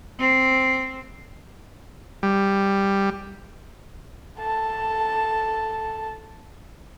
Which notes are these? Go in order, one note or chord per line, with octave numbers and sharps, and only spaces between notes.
C4
G3
A4 A5